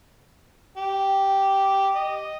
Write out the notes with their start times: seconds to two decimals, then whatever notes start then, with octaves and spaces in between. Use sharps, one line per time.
0.78 G4
1.96 D#5